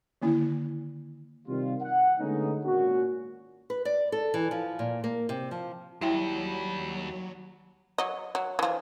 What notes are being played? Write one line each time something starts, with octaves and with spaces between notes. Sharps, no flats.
D3 D#3 A#3 C#4 E4
C3 D#3 G3 C4 F4
F#5
D3 G#3 A3 B3 C#4 D#4
G#1 A#2 A#3 C#4 F#4
B4
D5
A4
E3
F3
A#2
A#3
C3
F3
D#2 F#3 G3 E4 E5 G5 B5
F#3 D#5
F#3
E3 F3